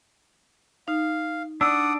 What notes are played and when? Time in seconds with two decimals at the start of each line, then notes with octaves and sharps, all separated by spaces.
0.88 D#4 F5
1.61 D4 D5 F#5 D#6 E6